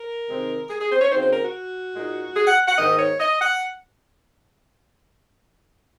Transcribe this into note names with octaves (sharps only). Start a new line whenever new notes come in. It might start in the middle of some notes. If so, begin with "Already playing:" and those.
Already playing: A#4
C3 D#3 G#3 C4 D#4
G#4
G#4
C5
C#5
C#3 F#3 C4 D#4 C5
C5
A#4
F#4
A#2 G#3 D#4
G#4
F#5
F#5
G#2 D#3 A#3 D#5
C#5
D#5
F#5